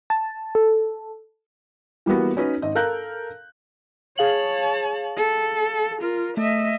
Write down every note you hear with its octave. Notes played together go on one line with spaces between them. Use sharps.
A5
A4
E3 G3 A#3 B3 F#4
C#4 D#4 F#4 B4 D#5
G#1 D#5
A4 A#4 F5 A#5 F#6 G6
G#4 C#5 F5 A5 F#7
A4
F4 A#4
A3 D#5 E5